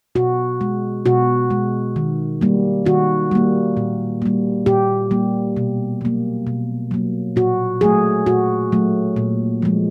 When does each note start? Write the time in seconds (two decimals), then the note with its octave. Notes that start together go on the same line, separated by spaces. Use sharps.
0.15 B2 F#4
0.61 G#3
1.06 B2 F#4
1.50 G#3
1.96 D#3
2.41 G3 A#3
2.86 D#3 F#4
3.31 G3 A#3
3.77 A#2
4.22 G3 A#3
4.66 A#2 G4
5.11 G3 A#3
5.57 B2
6.01 F#3 A#3
6.47 B2
6.91 F#3 A#3
7.36 A#2 F#4
7.81 F#3 A3 G#4
8.26 A#2 F#4
8.72 F#3 A3
9.16 A#2
9.62 F3 G#3